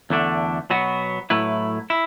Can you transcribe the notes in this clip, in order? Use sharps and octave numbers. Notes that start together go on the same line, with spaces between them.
E2 D3 A3 D4
B2 F#3 B3 F#4
A2 F#3 A3 E4 B4
E4